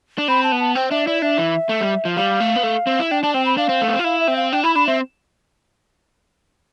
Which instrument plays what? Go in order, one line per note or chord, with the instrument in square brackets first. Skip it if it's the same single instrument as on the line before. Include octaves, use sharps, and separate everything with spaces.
[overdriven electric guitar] D4
[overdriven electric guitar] C4 [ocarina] B5
[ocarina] A5
[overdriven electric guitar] B3
[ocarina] A5
[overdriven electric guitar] C4 [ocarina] G5
[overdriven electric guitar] D4 [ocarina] E5
[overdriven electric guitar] E4 [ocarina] D5
[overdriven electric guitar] D4 [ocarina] E5
[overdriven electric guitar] E3
A3
G3
F3
[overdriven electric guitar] G3 [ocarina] F5
[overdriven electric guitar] A3
B3
A3
C4
E4
[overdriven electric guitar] D4 [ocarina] G5
[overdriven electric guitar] D4 [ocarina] A5
[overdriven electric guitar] C4 [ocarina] G5
[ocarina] B5
[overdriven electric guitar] D4 [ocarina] F5
[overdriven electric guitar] C4
A3
B3
C4
F4
[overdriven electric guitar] E4 [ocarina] F5
[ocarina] E5
[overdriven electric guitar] C4
[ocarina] F5
[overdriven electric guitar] D4 [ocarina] G5
[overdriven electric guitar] E4 [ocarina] B5
[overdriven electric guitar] D4 [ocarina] B5
[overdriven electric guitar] C4 [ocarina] E5